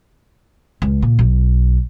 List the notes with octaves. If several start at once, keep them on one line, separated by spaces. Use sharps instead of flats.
C#2
A#2
B1